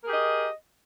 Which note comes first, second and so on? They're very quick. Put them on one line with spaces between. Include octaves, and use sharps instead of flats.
A#4 G#4 G4 D#5